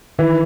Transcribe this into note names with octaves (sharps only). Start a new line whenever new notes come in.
D#3 E3